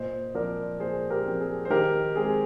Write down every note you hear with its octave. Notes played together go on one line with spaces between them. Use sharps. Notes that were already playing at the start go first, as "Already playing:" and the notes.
Already playing: A#2 C5 D#5
F3 C4 A#4 D5
A#2 G#4 C5
G4 A#4
F3 C4
G#4
C5
D#3 G4 A#4
G#3 C4 G#4